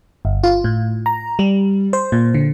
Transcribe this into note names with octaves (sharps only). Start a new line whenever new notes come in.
G1
F4
A2
A#5
G3
C5
A#2
D3